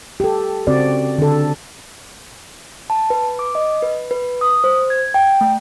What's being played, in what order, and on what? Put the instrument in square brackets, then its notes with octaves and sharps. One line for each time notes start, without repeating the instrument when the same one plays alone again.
[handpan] G4 A4
C#3 C4 F#4 D5
D3 A4
[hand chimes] A5
B4
D6
D#5
B4
B4
D#6
C5
G#6
G5
A3